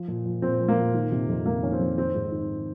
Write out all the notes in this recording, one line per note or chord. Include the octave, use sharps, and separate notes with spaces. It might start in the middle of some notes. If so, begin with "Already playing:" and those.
Already playing: F3
A#2
F3
A#2 C4
F3
A#3
A#2
D#3
C3
F2
F2 A#3
D#3 C#4
C4
F2
D#3 C4
G#2
D#3